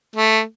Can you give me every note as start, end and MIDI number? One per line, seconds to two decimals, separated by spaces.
0.16 0.41 57